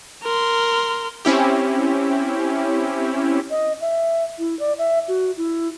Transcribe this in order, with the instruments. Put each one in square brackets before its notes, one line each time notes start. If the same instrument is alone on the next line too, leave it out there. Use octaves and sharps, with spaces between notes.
[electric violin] A#4 C6
[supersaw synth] C4 C#4 E4 G4
[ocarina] D#5
E5
E4
D5
E5
F#4
E4